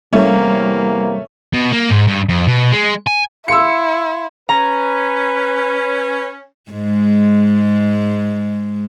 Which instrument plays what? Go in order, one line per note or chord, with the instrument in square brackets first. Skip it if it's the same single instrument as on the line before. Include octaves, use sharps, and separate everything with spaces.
[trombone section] E2 C3 A#3 [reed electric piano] G3 [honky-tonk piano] A3 C#4 E4
[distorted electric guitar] B2
A#3
G#2
G2
F2
B2
G#3
G#5
[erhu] E4 [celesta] F5 C6 [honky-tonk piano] E6 C#7
[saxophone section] C#4 [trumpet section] B4 [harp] A#5
[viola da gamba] G#2 G#3